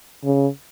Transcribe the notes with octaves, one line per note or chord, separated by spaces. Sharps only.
C#3